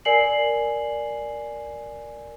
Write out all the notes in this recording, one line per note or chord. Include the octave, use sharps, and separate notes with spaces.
A#4 D5 G#5 C7 F#7